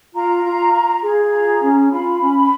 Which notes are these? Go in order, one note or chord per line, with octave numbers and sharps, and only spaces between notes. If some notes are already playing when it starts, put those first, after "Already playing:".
F4 A#5
F4
F4
G#4
F4 A#5
C#4
F4 B5
C#4